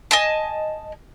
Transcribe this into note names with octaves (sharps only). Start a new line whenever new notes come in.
D#5 G#5 A5